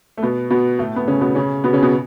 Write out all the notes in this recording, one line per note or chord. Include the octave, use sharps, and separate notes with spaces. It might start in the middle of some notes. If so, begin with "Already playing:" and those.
A3
B2 B3
B2 B3
A2 A3
B3
C#3 C#4
B2 B3
C#3 C#4
B2 B3
C#3 C#4
B2 B3